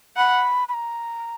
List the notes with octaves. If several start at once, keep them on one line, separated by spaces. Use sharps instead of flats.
F#5 B5
B5
A#5